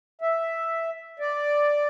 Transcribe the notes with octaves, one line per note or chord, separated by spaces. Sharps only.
E5
D5